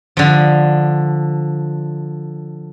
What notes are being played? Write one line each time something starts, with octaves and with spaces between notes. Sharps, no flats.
D3 F3